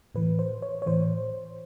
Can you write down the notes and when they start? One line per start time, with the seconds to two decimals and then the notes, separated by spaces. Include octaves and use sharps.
0.15 A2 E3 B4
0.39 C5
0.62 C#5
0.82 C#5
0.86 A2 E3 C5